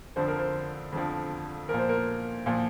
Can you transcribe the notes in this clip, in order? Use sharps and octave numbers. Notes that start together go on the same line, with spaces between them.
F2 D3 F3 C5
A#4
C5
F2 D3 F3
A#2 F3 A#4
C5
A#4
A#2 F3